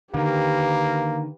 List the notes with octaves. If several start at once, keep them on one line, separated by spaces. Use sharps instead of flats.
D3 D#3 A#3 G4 B4